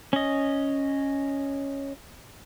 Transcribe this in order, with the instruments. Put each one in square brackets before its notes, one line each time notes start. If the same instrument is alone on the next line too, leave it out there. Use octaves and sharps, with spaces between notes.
[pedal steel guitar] C#4 D#5